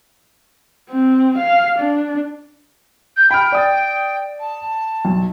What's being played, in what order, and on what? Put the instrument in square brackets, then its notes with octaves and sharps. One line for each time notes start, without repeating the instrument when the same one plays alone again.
[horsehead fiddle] C4
F5
D4
[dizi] G6
[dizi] G5 [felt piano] B5 F6
[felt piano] D5 D#6 A6
[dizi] A5
[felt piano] B1